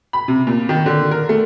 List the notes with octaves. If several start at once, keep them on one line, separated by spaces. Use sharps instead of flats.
B5
C3
A#2
D#3
D3
A#4
A3